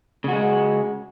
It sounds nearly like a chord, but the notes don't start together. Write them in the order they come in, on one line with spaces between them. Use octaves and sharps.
C#3 F#4 G#3